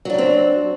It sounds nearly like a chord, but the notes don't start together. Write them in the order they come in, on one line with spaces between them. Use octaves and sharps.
F#3 D4 G3 C4